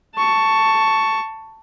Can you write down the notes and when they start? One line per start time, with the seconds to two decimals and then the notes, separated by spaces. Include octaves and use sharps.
0.16 A5 C#6